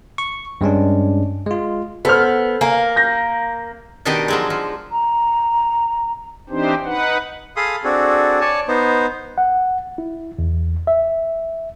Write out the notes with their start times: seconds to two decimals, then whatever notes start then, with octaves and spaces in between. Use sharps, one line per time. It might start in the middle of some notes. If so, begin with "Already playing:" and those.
0.18 C#6
0.61 G2 G#3 C#4 D4
1.46 G#3 F4
2.05 B3 A4 C5 F6
2.61 A#3 G#5
2.96 G6 A#6
4.05 B2 D#3 D4 D#4 G4 D#5
4.28 F3 F#3 G#3
4.50 F3
4.92 A#5
6.49 E3 C4 D4 D#4 G4 C5
6.85 D#4 B4 F#5
7.56 G#4 A4 F5 B5 C6 D#6
7.84 C4 D4 F#4 G#4 A4
8.41 C#5 D5 G#5 A5
8.68 B3 D#4 C5
9.38 F#5
9.98 E4
10.39 E2
10.87 E5